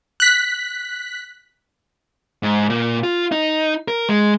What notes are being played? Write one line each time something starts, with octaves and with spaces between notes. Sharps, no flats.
F#6 B6
G#2
A#2
F4
D#4
A#4
G#3